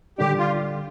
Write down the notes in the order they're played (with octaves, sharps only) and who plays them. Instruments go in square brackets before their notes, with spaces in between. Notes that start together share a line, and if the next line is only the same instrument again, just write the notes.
[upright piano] D3 G3 D4 [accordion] G4
[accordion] F4